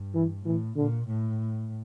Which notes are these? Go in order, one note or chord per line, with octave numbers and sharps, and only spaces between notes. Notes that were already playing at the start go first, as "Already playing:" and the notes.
Already playing: G2
E3
A2 E3
A#2 D3
A2